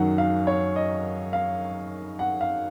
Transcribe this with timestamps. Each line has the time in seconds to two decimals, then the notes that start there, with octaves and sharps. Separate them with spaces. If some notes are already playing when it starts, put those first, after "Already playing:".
Already playing: F#2 D#3 F#3 F#5
0.18 F5
0.47 C#5
0.76 D#5
1.33 F5
2.19 F#5
2.41 F5